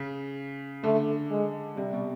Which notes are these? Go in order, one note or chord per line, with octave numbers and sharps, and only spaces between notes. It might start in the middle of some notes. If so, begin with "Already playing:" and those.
Already playing: C#3
D3 A3
G#3
C3 G3
B2